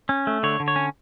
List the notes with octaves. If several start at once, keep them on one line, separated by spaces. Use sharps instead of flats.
C#4
A3
D3 C#5
D3
C#5
C#4